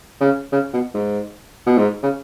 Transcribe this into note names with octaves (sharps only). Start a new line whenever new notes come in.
C#3
C#3
B2
G#2
B2
G#2
C#3